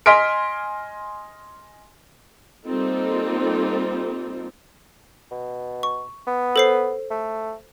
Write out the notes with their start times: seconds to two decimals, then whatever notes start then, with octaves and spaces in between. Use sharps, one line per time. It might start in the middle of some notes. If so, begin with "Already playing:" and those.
0.06 D#5 G#5 C6 F6 B6 D7
2.67 G3 A#3 C4 D#4 F4 A4
5.31 B2
5.83 C#6
6.27 B3
6.56 A4 C5 C7
7.10 A3